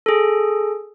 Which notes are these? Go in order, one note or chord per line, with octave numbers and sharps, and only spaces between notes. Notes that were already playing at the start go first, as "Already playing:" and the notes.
G#4 A4